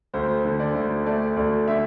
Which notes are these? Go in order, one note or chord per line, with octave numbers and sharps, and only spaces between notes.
D2 C5
D3
D5
D2
A3 D5
D2 D5
D3 E5